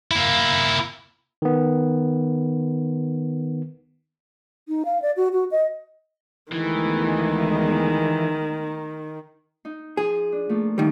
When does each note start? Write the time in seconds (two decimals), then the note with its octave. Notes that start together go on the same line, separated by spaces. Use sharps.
0.11 A#3 E4
1.42 D#3 B3
4.68 D#4
4.85 F5
5.02 D5
5.17 F#4
5.33 F#4
5.51 D#5
6.53 D2 D#3 E3 G#3 B3
9.65 D#4
9.97 F3 G#4
10.32 D4
10.49 F3 A3 A#3
10.78 D#3 G3 A4